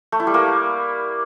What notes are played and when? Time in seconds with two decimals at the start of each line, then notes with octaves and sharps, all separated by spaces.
0.12 A3
0.20 E4
0.27 G3
0.34 A#3